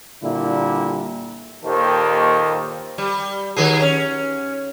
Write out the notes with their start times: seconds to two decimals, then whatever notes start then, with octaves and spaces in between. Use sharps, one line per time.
0.23 A#2 D3 G3 A#3 E4
1.64 D#2 A#2 D#3 G4 A4 C5
2.98 G3
3.56 D#3 F#3 G#4
3.82 C#4